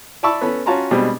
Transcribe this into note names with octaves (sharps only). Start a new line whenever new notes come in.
D5 E5 A5 B5 C#6 E6
B3 C#4 A4 B5
C#4 F4 F#4 A5 A#5 C6
B2 G3 G#3 C4 D4